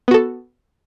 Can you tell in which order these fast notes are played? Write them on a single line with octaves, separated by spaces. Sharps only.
B3 F#4 A4